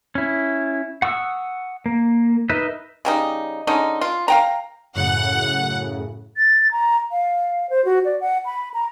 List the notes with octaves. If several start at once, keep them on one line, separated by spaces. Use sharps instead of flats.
C#4 E4
F#5 C#6 D#6 E6
A#3
D#4 A#4 B4 D#5 E5
C#3 G3 D#4
D3 G#3 C#4 D#4
F4
F5 G5 A#5
F#2 A2 C#3 F#5
A6
A#5
F5
C5
F#4
D5
F#5
B5
A#5